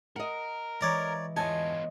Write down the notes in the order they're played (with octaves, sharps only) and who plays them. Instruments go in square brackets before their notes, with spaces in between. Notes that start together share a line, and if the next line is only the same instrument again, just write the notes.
[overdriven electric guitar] A#4 [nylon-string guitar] D#5 F#5
[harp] E3 G#3 [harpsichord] C#5 D5 A#5
[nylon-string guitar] E2 A5 [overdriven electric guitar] B3 F4 [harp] C#5 D#5 [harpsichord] G#5